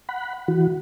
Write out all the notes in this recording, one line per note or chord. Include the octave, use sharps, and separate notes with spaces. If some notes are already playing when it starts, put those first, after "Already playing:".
F#5 B5
E3 F#4